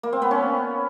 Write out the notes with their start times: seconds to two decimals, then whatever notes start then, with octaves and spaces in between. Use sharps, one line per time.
0.03 A#3
0.13 C4
0.22 B3
0.31 C#4